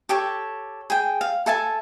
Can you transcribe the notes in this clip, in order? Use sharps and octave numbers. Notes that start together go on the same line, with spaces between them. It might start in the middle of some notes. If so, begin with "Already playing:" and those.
G4 A4 C#5
G#4 G5
F5
A4 E5 G#5 A5